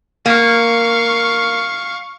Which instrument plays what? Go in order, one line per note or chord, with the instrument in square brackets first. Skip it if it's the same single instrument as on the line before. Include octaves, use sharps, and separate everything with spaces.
[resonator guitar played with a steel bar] A#3 [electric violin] F5 C#6